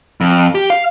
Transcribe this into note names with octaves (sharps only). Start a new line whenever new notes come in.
F2
G4
F5